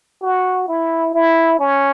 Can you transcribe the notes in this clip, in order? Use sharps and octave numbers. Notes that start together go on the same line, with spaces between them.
F#4
E4
E4
C#4